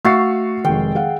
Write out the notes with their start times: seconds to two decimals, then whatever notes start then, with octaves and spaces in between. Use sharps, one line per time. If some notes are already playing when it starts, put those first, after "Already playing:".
0.05 A3 F#4 F5 E6 A6 C7
0.65 F1 D#3 G#3 G5
0.95 G#4 F5 F#5